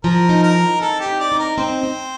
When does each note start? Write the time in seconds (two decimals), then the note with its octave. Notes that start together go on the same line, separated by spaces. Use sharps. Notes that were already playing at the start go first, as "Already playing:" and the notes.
0.04 F3 A#4
0.29 D#4
0.43 A#4
0.55 D#4
0.81 C4 A4
1.00 G4
1.06 D#4
1.20 D5
1.32 D#4
1.39 A#4
1.58 C4 C5
1.83 C4